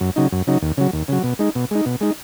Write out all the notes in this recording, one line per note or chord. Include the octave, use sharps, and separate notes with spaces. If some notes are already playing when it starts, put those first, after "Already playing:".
F#2
C#3 F#3 D#4
F#2
C#3 F#3 D#4
D#2
C#3 F#3
D#2
C#3 F#3
B2
G#3 D#4
B2
G#3 D#4
B2
G#3 D#4